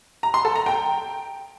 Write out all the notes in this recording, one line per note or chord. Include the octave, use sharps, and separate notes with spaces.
A#5
C6
A4
A#5
G5